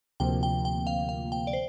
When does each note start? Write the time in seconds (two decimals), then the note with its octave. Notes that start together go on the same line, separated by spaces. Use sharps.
0.20 D2 C3 F3 A#3 G5
0.43 G5
0.65 G5
0.87 F5
1.09 F5
1.32 G5
1.47 D5
1.53 C5